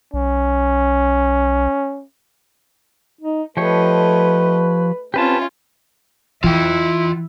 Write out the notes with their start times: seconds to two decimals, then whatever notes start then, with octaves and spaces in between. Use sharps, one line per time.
0.14 B1 C#4
3.21 D#4
3.57 F3 A3 G4 B4 C#5 D#5
5.14 C4 C#4 F4 G4 B4 A5
6.44 E3 E4 F4 G5